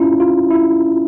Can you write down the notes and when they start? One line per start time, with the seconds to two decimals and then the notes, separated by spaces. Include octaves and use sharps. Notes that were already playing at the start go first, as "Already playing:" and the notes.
Already playing: C#4 E4 F4
0.20 F4
0.51 E4